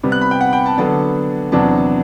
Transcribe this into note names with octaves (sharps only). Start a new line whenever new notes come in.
C3 G3 B3
F#6
B5
G5
F#5
G5
A5
D3 F#3 B3 D4 A5
E2 C3 F#3 B3 D4 A5